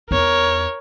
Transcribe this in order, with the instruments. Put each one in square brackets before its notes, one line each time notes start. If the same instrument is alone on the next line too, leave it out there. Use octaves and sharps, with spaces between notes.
[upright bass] E2 D#4 [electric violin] A#4 C#5